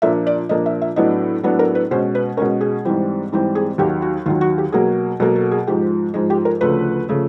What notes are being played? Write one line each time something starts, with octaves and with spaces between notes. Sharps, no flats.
A#2 F3 A#3 D4 E5
D5
A#2 F3 A#3 D4 D#5
E5
E5
A2 F#3 B3 D4 D#5
A2 F#3 B3 D4 A4
A#4
B4
B2 G#3 C#4 C5
B4
B2 G#3 C#4 A#4
G#4
G#2 E3 G3 C4
G#2 E3 G3 C4
G#4
D#2 D#3 F#3 G4
F#4
D#2 D#3 F#3 F4
F#4
G4
B2 F#3 A#3 G#4
B2 F#3 A#3 A4
A4
G#4
G#2 F3 G#3 G4
G#2 F3 G#3
G4
A#4
D2 C#3 F3 A3 B4
C#3 F3 A3